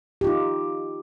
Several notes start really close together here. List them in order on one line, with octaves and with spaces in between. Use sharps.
G4 F4 D#4